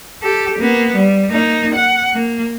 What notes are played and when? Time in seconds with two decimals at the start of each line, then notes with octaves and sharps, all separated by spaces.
0.22 G4 A4
0.59 A#3 B3
0.95 G3
1.31 A#3 D#4
1.75 F#5
2.14 A#3